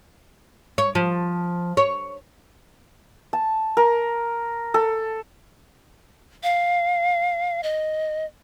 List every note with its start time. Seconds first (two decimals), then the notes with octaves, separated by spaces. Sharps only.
0.78 C#5
0.95 F3
1.77 C#5
3.33 A5
3.77 A#4
4.74 A4
6.43 F5
7.63 D#5